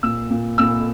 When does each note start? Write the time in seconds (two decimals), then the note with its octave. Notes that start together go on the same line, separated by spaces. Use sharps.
0.03 A#2 E6
0.30 A#2
0.58 A#2 E6